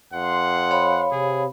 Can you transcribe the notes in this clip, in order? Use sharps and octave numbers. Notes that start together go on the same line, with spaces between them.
F2 F#5 C6
C#5 F5 B5
C3 G#4